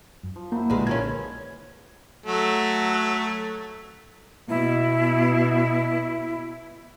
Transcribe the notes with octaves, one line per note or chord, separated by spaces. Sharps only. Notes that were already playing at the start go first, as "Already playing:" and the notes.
F#2
F3
F#3 A#3 E4
B1 A#2 D3 G3 G#3 F#4 G#4 B4
D#3 F3 F#3 C4 C#4 G#6
F#3 A3
B2 E4